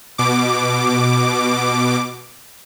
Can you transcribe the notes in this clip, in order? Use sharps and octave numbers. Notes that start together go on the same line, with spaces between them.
B2 D6